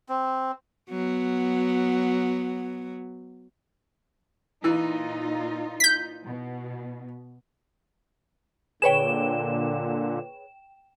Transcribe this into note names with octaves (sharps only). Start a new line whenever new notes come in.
C4
F#3 B3
A#2 E3 D#4 F4
G6 B6
B2
A#2 D3 G#4 B4 C#5 G5 E7